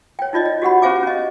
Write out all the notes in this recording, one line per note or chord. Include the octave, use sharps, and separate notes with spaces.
C#5 G5
D#4 F4 D5 D#5
D5
F#4 G4 F#5 B5
C#4 G4 C5 F5 G#5 D6
C#4 D#5